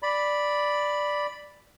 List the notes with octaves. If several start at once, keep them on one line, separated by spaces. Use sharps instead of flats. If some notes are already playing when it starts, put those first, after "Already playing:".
D5 B5